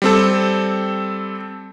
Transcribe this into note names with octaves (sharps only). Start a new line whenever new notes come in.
G3 C4 A4